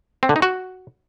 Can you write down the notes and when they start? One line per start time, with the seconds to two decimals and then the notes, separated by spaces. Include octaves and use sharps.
0.23 C4
0.29 D3
0.36 D#4
0.42 F#4